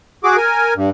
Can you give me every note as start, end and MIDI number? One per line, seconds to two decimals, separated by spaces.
0.24 0.37 66
0.24 0.37 68
0.24 0.37 86
0.37 0.74 70
0.37 0.74 80
0.76 0.90 43